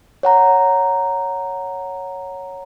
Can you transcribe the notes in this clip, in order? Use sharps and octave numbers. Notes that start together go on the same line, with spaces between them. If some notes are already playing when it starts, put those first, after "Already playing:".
C#5 F#5 A#5